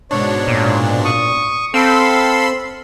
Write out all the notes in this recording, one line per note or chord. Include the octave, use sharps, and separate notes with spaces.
G#2 B2 D4 C#5
A#2
C#6 D#6
C4 A4 F5 B5 C6 E6